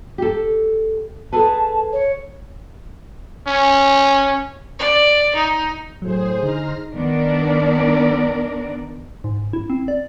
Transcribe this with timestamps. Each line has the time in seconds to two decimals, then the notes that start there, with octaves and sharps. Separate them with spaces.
0.18 G4 A4
1.33 G#4 A4 B4 A5
1.93 C#5
3.47 C#4
4.79 D5
5.35 D#4
6.02 A2 F#3 G#4 C5
6.43 D3 D#4 A#5 C6 F6
6.94 D#3 B3 D4 A#4 D5
9.24 G#2
9.53 E4
9.70 C4
9.88 D5